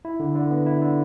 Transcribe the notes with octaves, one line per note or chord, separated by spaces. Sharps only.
E4
D3
D3
B3
E4
D3